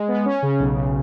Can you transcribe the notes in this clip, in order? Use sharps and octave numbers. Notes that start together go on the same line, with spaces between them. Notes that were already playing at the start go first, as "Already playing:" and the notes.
Already playing: G#3
B3
C#4
C#3
B1
B1